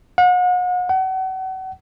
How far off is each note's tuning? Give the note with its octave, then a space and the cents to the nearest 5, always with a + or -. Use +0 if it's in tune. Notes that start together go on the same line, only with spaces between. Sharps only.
F#5 -40
F#5 +35